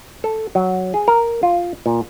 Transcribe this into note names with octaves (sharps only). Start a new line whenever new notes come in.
A4
F#3
G#4
A#4
F4
A#2